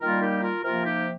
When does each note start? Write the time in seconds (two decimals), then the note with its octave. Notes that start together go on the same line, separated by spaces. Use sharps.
0.01 D#3 G3 A#3 F4 A#4
0.21 D#4 G4
0.42 F4 A#4
0.63 C3 F3 A#3 F4 A#4
0.85 D#4 G4